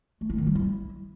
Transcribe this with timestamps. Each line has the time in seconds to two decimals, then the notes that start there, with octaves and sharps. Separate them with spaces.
0.21 A3
0.30 E4
0.38 D#3
0.47 G3
0.55 E4